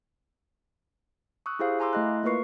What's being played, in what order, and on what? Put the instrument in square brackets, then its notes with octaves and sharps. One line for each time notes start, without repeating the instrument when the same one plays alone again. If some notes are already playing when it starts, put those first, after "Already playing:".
[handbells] C#6 D#6 E6 F#6
E4 G4 G#4 C5 F5
F5 G#5 A#5 C6 D6 E6
A3 E4 D#5 C6 F#6
A#3 F4 A#4 B4 C#6 C7